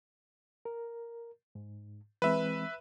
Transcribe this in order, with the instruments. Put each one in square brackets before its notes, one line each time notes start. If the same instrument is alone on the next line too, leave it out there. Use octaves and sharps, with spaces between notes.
[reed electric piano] A#4
G#2
[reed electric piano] E3 G#3 C4 [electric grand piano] B4 E5